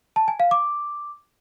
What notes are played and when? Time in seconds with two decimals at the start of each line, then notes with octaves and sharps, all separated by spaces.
0.16 A5
0.28 G#5
0.40 F5
0.51 D6